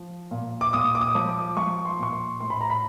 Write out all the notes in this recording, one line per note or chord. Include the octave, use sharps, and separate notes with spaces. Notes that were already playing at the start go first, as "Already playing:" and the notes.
Already playing: F3
A#2
D6
A#2 D#6
D6
D#6
F3
D6
F3 C#6
C6
A#2 C#6
C6
A2 C6
B5
A#5
B5